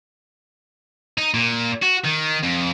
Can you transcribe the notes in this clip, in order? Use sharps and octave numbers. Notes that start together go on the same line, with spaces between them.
D#4
A#2
F#4
D#3
F2